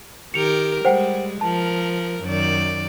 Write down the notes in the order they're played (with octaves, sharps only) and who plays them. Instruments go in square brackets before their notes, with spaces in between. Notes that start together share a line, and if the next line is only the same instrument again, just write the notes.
[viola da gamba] D#3 G4 A#4 [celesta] C#7 F7
[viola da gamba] G3 G#3 [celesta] C5 F#5 G5
[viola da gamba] F3 A#4 [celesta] A5
[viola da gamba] F#2 D#3 D5